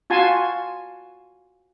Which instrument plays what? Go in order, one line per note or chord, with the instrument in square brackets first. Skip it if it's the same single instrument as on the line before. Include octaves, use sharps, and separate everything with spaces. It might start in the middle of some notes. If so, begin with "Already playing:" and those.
[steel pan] F4 F#4 G#5 A5 C6